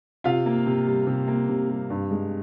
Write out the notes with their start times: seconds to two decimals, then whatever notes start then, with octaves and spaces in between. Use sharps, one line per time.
0.24 C3 F4 F5
0.46 A#3
0.66 C3
0.87 G3
1.07 C3
1.28 A#3
1.49 C3
1.69 G3
1.90 G2
2.11 G#3